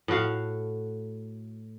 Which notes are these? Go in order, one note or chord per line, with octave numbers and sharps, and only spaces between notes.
A2 A3 F#4 F5